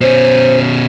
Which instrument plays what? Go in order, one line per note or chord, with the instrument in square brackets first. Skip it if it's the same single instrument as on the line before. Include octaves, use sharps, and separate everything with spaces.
[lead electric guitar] B2 C#4 [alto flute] C5